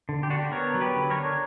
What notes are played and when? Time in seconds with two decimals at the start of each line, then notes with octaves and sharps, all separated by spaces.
0.09 D3
0.23 G4
0.30 D4 F#4
0.38 G4
0.52 B3 A#4 C#5
0.74 F#3
0.81 G4 B4
0.96 D3
1.10 A#4 C#5
1.18 D4